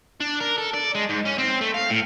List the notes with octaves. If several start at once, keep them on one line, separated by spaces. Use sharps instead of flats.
D4
A#4
A4
D5
G#3
G#2
C#4
C4
A3
F5
A2